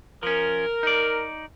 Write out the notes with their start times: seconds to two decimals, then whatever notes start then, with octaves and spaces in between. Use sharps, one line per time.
0.23 F3 C#4 A#4
0.83 D#4 D5